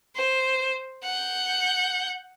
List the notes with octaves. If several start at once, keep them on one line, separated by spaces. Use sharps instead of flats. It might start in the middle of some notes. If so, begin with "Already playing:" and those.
C5
F#5 G6